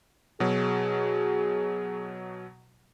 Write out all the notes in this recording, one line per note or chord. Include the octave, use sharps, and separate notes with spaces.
B2 F#3 G#4